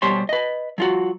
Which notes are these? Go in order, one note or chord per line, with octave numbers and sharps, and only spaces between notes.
B2 G3 G4 C5 C#5 C6
B4 D#5
F#3 F4 F#4